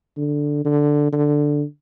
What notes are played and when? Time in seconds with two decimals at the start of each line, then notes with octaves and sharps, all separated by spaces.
0.17 D3
0.65 D3
1.12 D3